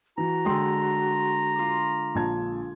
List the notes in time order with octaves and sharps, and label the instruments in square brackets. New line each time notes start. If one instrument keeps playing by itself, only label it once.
[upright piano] E3 [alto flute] F#4 [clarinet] A#5
[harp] D3 G#3 [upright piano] G5 C6
[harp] F4 D6
[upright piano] A#1 A5 G#6